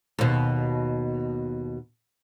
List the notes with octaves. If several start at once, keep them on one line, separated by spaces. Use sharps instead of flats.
D#2 B2